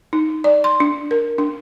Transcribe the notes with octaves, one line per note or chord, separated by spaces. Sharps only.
D#4
D5
C6
D4
A#4
D4